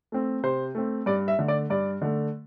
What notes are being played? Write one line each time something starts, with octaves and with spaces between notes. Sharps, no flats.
A3 C4
C3 C5
A3 C4
G2 D5
E5
D3 A3
D5
G2 D5
D3 A3